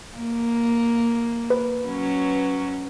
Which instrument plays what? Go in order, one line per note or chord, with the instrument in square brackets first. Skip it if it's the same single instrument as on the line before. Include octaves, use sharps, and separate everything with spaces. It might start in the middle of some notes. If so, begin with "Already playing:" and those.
[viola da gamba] A#3
[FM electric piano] B4
[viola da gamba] F#3 C#4